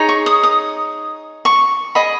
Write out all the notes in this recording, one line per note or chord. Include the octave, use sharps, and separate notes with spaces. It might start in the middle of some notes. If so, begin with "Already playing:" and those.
Already playing: D#4 G#4 C#5
C#6
D#6
D#6
C#6
G#4 D#5 B5